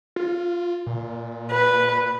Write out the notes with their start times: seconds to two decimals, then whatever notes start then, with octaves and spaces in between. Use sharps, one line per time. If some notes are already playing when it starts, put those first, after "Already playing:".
0.16 F4
0.87 A#2
1.51 B4